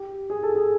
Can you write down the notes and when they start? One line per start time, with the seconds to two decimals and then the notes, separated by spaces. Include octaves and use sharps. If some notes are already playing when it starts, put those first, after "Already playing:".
Already playing: G4
0.30 G#4
0.43 A4
0.56 G#4